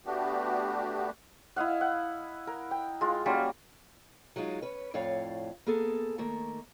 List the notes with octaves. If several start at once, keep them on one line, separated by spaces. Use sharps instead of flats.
A3 B3 D4 F#4 G4
E4 D#5 F5 F#5
F#5
A#4
G5
G#3 F4
F#3 G3 A#3 C#4
F#3 G#3 D#4 F4
C#4 B4
F2 A2 C#5 D5 F5
A#3 B3 G#4 A4
D#3 A3 A#3